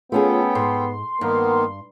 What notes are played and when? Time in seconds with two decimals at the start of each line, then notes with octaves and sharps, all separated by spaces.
0.12 A3 B3 C#4 F4 G#4 A4 G5
0.55 G#2 C6
1.21 G2 D#3 A#3 B3 A#4